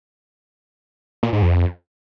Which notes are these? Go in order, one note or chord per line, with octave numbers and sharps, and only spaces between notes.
A#2
G#2
F2